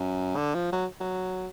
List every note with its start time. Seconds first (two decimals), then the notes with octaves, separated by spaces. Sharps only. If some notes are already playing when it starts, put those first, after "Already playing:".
Already playing: F#2
0.36 D3
0.54 F3
0.72 F#3
1.00 F#3